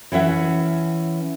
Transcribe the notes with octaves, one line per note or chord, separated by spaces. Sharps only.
E3 C#4 E5 F#5